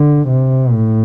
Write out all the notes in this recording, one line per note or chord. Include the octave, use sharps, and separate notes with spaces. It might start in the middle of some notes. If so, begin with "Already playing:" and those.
Already playing: D3
C3
A2